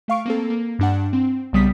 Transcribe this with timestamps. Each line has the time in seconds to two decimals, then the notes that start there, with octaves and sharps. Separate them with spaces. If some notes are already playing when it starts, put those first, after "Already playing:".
0.08 A3 F5 C#6 D7
0.25 A#3 C4 A4
0.50 A#3
0.79 G2 D4 F#5
1.13 C4
1.53 B1 C#3 G3 B3 D#6 B6